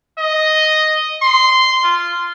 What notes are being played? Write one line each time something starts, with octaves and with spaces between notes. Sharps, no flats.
D#5
C6
F4